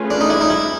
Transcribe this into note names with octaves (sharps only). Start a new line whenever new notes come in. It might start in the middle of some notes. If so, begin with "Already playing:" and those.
Already playing: A3 C#4 F4 G#4 B4
D4
D#4
E4
D#4
E4